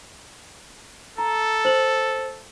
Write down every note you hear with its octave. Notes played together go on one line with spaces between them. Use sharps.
A4 A#5
C5 F#7